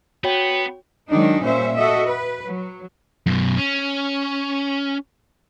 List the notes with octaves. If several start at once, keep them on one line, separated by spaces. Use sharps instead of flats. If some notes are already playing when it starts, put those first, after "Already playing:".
B3 F#4 C#5 G5
D#3 F#3 G#3 D4 D#4
A#2 G3 C#4 C5 E5
F#4 A4 D#5 E5
B4
F#3
F#2 B2
C#4